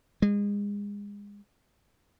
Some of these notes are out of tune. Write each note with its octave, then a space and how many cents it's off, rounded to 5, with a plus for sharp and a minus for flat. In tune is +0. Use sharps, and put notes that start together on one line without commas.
G#3 -30